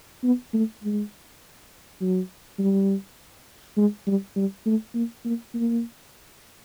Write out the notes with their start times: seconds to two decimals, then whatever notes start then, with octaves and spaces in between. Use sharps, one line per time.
0.23 B3
0.53 A3
0.83 G#3
2.01 F#3
2.59 G3
3.77 G#3
4.07 G3
4.36 G3
4.65 A3
4.94 A#3
5.25 A#3
5.54 A#3